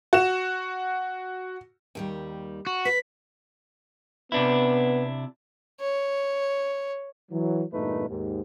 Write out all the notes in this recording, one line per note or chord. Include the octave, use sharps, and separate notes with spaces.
F#4 E7
D#2 D#3 G3
F#4
B4 B6
C3 B3 D4 E4
C#5
E3 F#3
E2 G2 A#2 A3 D#4 B4
D#2 G#2